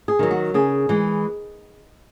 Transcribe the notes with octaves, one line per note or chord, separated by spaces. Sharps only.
G#4
D#3 F#3
F#4
C#3 G#4
E3 G#3